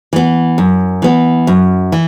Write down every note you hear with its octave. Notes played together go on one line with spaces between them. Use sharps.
E3 B3
F#2
E3 B3
F#2
E3